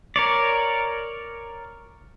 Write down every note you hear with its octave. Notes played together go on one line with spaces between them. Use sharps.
A#4 C#5 D5